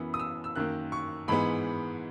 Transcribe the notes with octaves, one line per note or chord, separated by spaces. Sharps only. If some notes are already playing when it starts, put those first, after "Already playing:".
Already playing: F#2 E3 B3
D#6
E6
E6
F#2 D#3 A#3 F#6
C#6
G#2 E3 G#3 B3 B5